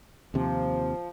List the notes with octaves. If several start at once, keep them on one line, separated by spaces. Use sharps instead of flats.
D#2 C3 F3